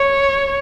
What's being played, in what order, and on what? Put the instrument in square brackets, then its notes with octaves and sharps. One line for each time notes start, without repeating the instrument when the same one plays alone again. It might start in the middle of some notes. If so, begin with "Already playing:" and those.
Already playing: [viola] C#5